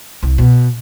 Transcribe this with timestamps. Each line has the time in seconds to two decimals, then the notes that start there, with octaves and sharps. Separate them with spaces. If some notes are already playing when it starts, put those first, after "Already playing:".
0.23 C2
0.38 B2